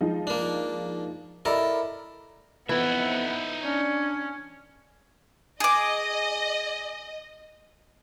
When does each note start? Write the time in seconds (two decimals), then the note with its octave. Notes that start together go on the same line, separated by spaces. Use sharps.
0.01 F3 G#3 D#4
0.27 A#3 D4
1.45 E4 A4 A#4 D5 D#5 A#5
2.69 F2 E3 B3 D#4 E4 E5
3.63 C#4 D4
5.60 G#4 D#5 D6